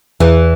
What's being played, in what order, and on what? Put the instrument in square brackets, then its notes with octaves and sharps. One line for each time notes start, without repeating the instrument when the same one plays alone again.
[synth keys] E2 [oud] E3